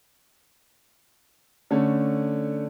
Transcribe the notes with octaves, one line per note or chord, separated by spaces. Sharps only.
D3 A3 C#4